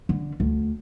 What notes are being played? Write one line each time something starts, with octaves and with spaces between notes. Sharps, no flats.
D3
D2